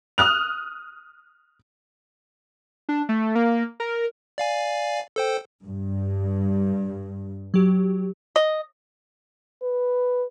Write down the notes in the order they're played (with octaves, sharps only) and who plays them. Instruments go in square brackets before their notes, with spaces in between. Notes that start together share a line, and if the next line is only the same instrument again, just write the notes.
[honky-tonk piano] D#6 F6 F#6 F7
[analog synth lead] D4
A3
A#3
A#4
[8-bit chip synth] D5 F5 G#5
A4 C5 G5
[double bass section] G2
[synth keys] F#3 G4
[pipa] D#5
[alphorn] B4